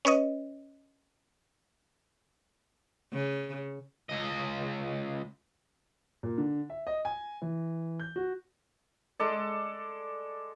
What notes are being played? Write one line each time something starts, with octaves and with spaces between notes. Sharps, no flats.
C#4 B4 C#5 D#5
C#3
C#2 D#5
A#2
D3
E5
D#5
G#5
E3
G6
F#4
G#3 A4 D5